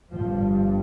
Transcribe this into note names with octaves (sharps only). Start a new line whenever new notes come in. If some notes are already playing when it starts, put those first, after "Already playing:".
G1 G2 F3